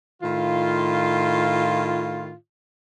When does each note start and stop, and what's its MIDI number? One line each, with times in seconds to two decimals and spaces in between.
0.22 2.32 45
0.22 2.32 51
0.22 2.32 65